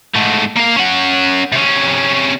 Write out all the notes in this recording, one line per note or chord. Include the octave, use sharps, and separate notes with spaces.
G#2 A3
A#3 F5
C#4 F#5
C3 C#4